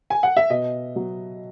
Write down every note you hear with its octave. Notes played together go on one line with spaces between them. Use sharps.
G#5
F#5
E5
B2 D#5
F#3